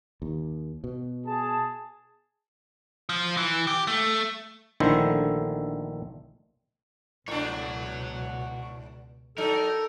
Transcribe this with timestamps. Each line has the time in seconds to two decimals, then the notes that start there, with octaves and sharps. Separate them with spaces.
0.22 D#2
0.84 B2
1.26 G#4 A5
3.09 F3
3.37 E3
3.67 G4
3.87 A3
4.80 A#1 D3 D#3 A3 E4 C5
7.28 C#2 G#2 B2 D4 C#5 F#5
9.38 F#3 D#4 A4 A#4